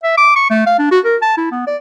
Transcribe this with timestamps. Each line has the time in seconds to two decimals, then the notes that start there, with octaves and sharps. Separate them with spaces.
0.03 E5
0.18 D6
0.36 C#6
0.50 A3
0.66 F5
0.79 D4
0.91 F#4
1.05 A#4
1.22 A5
1.37 E4
1.51 B3
1.67 D5